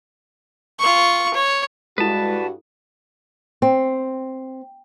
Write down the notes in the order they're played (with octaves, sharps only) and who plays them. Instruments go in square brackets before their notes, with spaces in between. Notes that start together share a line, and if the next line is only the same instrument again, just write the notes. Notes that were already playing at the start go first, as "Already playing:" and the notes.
[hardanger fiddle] F4 C#6
C#5
[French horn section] G2 F#4 [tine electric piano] G#3 [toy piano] E4 A4 [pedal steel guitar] B4 A5
[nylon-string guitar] C4